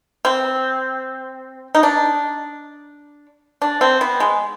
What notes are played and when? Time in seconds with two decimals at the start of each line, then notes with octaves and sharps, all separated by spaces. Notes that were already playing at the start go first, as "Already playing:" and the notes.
0.25 C4
1.75 D#4
1.83 D4
3.62 D4
3.81 C4
4.01 B3
4.20 G#3